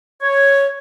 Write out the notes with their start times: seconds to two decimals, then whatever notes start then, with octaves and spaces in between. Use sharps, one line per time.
0.21 C#5